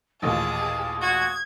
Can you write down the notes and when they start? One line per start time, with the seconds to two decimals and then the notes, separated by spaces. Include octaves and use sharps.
0.22 A1 D#2 A#2 G#4 A5 D#6
1.02 F#4 G#6